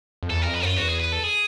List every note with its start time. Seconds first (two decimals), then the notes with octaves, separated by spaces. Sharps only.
0.23 F2
0.29 E2 A4
0.42 F2 A#4
0.54 B4
0.62 F#2 F4
0.77 E2 F#4
0.88 G#4
1.00 B4
1.13 A4
1.24 G#4